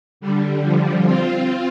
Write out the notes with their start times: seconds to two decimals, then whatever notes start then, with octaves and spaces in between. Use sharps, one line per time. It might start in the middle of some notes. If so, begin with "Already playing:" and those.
0.21 D3 G3
0.63 F3
1.05 C4 F4